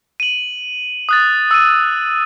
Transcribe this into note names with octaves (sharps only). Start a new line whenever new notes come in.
D#7 F#7
D#6 F#6 A6
E6 D#7